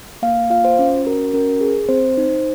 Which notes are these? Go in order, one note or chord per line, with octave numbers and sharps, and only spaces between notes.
A#3 F5
F4 F5
C5
C#4
F#4 A#4
C#4 A#4
G#4
C4 C5
D#4